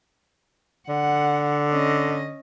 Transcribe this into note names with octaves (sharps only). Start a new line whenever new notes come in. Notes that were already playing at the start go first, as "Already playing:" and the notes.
D3 F#5
C#4 D#5